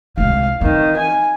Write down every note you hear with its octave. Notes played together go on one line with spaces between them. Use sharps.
C2 G#3 F5
D#3 E3 C4
G#5